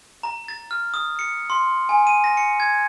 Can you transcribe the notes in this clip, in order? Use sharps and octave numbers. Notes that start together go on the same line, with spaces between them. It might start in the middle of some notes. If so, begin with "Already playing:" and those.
A#5
A6
F6
D#6
C#7
C6
G#5
D#7
A#6
C#7
G#6